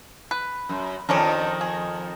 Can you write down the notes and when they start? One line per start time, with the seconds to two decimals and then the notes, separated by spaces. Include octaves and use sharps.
0.31 B4
0.69 F#2
1.09 F2 D#3 F3 C#4 D4 A#4
1.61 G#4